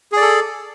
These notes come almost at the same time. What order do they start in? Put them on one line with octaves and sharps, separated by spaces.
G#4 D5 A4